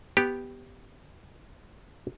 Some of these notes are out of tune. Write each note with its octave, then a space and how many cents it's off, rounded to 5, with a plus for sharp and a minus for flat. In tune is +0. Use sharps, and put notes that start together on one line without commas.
B3 +0 G4 +0